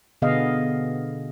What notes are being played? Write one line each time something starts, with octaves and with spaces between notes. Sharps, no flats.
B2 D3 B3 G#4 D#5 F5